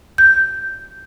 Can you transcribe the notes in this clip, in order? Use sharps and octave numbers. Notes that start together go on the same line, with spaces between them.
G6